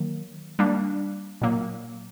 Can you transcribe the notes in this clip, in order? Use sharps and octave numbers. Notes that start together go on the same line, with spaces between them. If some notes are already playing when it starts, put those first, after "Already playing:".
Already playing: D#3 F#3 A#3
G3 A#3 D4
A#2 F#3 A#3